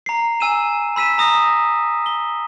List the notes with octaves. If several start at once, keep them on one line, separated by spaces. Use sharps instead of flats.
A#5 C7
G#5 E6 D#7 E7
B5 E6 B6 D#7 E7
A#5 D#6 A#6
G7